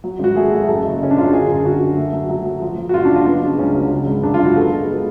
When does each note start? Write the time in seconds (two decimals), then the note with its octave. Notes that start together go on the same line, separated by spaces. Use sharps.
0.04 F#3
0.19 G#1 F#4
0.35 A3 G#4
0.52 A3
0.68 F#2 A4
0.83 F#1
1.01 C#3 C#4
1.11 D4
1.17 F#2 F4
1.25 F#4
1.33 D3 G#4
1.48 F#2
1.65 F#2 F#4
1.81 D3
1.97 A3
2.13 F#3
2.29 F#3
2.46 F#3
2.62 F3
2.78 F3
2.89 F#4
2.94 F#1 F4
3.05 D4
3.10 F#1
3.16 F4
3.26 B3 D4
3.43 C#3
3.59 C#2 C#4
3.75 F#3
3.91 C#3
4.07 G#1
4.23 F#2 D4
4.34 F4
4.39 G#1
4.45 F#4
4.56 B3 A4
4.72 G#3
4.88 B3